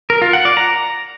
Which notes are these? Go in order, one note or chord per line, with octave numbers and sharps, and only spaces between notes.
A#4
F4
F#5
D5
A#5